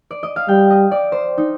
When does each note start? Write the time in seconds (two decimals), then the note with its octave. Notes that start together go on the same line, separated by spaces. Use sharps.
0.11 D5
0.23 D#5
0.36 F5
0.48 G3 G5
0.70 D#5
0.91 D5
1.12 C5
1.38 D#4